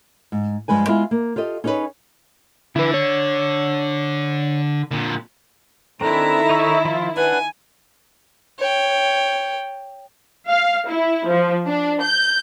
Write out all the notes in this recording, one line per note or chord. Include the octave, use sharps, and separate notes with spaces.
G#2
G2 F3 G#3 B4 G#5
G#3 B3 E4 F4 G#4
A#3
F4 G4 A4 D#5
C#4 D#4 G#4 A#4 B4 C#5
D3 E4 B4
C#5
A#2 D3
D#3 C4 D4 E4 A4 A#5
D#4 C#5 E5
F3 F4
D4 B4 F#5 G#5
C#5 G5
F5
E4
F3
D4
G6